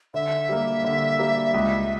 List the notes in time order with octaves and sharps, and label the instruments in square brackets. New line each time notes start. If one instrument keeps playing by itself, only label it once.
[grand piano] D3 [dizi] E5
[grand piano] G3 A#3
D3
G3 A#3
C#2